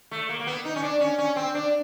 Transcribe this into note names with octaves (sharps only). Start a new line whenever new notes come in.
A3
A#3
A#3
B3
D#4
C#4
D4
C#4
C#4
C4
D4